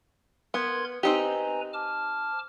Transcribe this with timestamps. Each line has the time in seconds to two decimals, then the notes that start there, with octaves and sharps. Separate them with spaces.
0.54 B3 A#4 C6 G#6
1.03 C4 D#4 G4 B4 G#5 A#5
1.73 A5 D6 F6